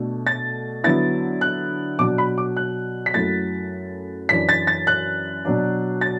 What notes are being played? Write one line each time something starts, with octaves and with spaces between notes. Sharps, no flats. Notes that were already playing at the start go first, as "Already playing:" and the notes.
Already playing: B2 A3 D4
A6
D3 F#3 B3 E4 A6
F#6
B2 F#3 D4 D6
B5
D6
F#6
B6
F#2 F#3 A3 E4 A6
F#2 E3 D4 B6
A6
A6
F#6
B2 F#3 D4
A6